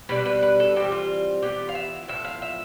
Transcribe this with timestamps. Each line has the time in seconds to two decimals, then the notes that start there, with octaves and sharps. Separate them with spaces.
0.09 B2 G3 D4 B4
0.25 B4
0.42 B4
0.60 A4
0.76 E3 G3 C4 G4
0.92 F4
1.42 E3 B3 F4 G4
1.69 F5
1.75 E5
2.08 A2 F3 B3 E5
2.25 F5
2.42 E5